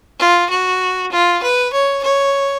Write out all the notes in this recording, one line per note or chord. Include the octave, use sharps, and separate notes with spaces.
F4
F#4
F4
B4
C#5
C#5